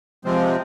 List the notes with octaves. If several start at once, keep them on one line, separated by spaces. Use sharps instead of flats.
C3 F3 G#3 C4